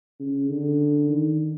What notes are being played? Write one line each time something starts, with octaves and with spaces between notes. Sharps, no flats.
C#3
D3
D#3